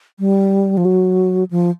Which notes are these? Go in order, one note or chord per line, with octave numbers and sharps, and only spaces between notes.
G3
F3
F#3
F3